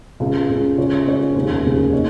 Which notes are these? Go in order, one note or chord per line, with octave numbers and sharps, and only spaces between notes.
C#2 C#3 G#3
C#2 C#3 G#3
C#3 G#3 C#4 F4 C#5
C#3 G#3 C#4 F4 C#5
F1 D#2 C#3 G#3
F1 D#2 C#3 G#3
A#3 D#4 C#5